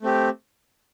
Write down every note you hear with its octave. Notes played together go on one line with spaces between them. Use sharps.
A3 C4 G4